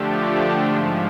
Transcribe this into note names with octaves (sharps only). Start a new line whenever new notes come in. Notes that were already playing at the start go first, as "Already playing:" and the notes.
Already playing: D3 F3 A3 D4 G4
G#2 F3 G#3